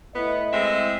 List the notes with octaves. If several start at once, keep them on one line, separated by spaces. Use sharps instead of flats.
A2 B3 E4 D#5
G#3 C4 E5